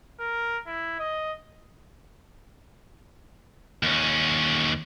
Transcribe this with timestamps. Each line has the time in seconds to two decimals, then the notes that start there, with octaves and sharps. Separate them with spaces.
0.20 A#4
0.67 E4
0.99 D#5
3.83 D#2 C#4